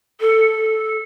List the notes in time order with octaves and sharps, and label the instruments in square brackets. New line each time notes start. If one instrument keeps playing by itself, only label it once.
[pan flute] A4